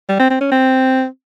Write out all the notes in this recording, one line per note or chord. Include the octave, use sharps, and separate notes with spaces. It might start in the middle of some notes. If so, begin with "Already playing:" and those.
G3
C4
C4
C#4
C4